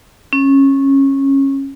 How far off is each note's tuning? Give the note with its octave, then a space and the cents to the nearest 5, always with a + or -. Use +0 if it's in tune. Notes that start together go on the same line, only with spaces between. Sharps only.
C#4 -20